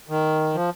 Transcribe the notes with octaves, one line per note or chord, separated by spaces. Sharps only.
D#3
F3